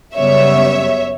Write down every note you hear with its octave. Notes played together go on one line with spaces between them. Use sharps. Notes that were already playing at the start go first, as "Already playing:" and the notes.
F#2 C#3 G3 B3 C#5 E5